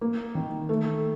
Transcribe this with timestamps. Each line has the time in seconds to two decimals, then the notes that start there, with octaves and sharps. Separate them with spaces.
0.01 A#3
0.35 D#3
0.69 A3